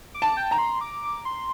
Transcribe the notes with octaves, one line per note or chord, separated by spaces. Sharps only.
D6
A5
G5
A#5
C6
D6
C6